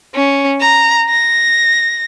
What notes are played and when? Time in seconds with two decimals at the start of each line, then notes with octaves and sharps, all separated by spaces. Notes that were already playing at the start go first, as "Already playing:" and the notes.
0.15 C#4
0.61 A#5
1.09 A#6